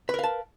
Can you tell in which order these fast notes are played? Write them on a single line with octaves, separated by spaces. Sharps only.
B4 A#4 F5 A5